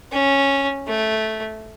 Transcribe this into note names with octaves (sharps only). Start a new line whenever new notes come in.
C#4
A3